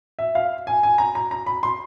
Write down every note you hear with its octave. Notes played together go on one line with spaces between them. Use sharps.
E5
F5
G#5
G#5
A#5
A#5
A#5
B5
C6